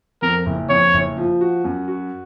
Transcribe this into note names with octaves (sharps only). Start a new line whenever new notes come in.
F2 A#4
F#1
F2 C#5
F#1
F3
F#4
F#2
F#4